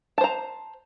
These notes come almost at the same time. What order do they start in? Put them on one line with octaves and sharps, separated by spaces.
A5 C5 A#5